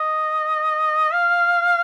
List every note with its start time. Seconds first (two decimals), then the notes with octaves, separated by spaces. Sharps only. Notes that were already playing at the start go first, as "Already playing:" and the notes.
Already playing: D#5
1.12 F5